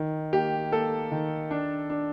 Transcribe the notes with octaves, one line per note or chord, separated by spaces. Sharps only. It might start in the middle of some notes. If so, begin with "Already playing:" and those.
Already playing: D#3
A#3 G4
A#3 A4
D#3
D4
D4